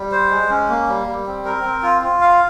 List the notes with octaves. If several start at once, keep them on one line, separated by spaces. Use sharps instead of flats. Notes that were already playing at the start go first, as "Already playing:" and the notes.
Already playing: G3
C5
G#3
C#4
A#3
G3
G3
C4
A#4
C4
F4
F4
F5